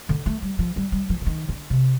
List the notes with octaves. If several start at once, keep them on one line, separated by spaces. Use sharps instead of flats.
D3
A3
G3
F3
G3
G3
F3
D3
D#3
D3
C3